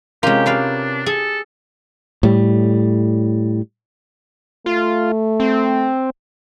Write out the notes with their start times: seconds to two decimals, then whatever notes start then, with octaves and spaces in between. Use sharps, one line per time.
0.23 C3 G#3 C#4 F4 G4 A#4
0.46 D4 G4 B4 F5
1.06 G#4 A4
2.23 A2 G3
4.66 A3 F4
5.40 C4